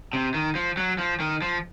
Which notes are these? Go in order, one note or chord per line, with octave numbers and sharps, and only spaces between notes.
C3
D#3
F3
F#3
F3
D#3
F3